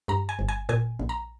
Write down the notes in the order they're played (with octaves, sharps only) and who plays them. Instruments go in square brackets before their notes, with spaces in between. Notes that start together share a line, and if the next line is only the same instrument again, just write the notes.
[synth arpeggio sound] G2 A#5
G#5
G1
G#5
A#2 G#5
A#1
A#5